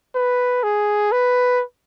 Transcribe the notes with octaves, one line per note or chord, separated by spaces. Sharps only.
B4
G#4
B4